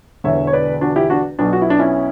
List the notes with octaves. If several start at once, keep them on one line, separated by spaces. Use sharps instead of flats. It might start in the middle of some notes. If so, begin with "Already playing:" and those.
E1 E2 D3 C#5 E5
C#5
B4 D5
D4 F#4
E4 G4
D4 F#4
B1 B2 D4
F#4
E4
D4
C#4 E4